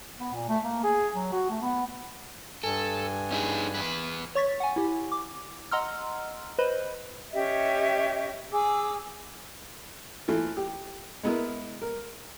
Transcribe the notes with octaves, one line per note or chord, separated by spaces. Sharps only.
B3
A#2
A3
A#3
G#4
F#3
F#4
A3
B3
G2 A4 G#5
C#4 D#4 G#4
E2 B4
C#5 C#6 A6 B6
F#5 G#5
E4 G4
D6
D#5 F#5 A#5 C6 E6 F6
B4 C5 D#5 B5
C#4 G4 D#5 E5
G#4 D6 E6
E3 A3 F4
G4
G#3 B3 E4 A#4
A#4